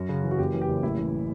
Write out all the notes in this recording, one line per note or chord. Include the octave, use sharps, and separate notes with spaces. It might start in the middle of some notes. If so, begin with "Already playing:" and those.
Already playing: F#2 F#4
C#3
E3
F#4
F#1 G4
E3
G4
F#1
A1 E4
E3